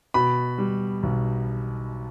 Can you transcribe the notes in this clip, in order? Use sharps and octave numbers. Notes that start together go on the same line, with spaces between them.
B2 B5
G3
B1